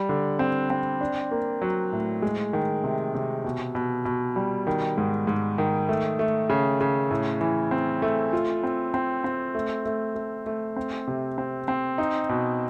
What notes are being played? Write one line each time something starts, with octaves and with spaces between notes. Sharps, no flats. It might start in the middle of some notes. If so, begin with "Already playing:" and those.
Already playing: G3
D3
C4
C4
D4
A#3
F#3
A2
G#3
D#3
C3
C3
B2
B2
B2
G3
D#3
G#2
G#2
D#3
A3
A3
C#3
C#3
A2
E3
C4
A3
F4
C4
C4
C4
A3
A3
A3
A3
C4
C3
C4
C4
D#4
B2